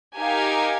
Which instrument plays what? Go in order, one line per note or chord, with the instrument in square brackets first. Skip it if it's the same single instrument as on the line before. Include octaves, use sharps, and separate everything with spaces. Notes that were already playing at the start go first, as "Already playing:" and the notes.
[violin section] D#4 G4 A#4 F5 G#5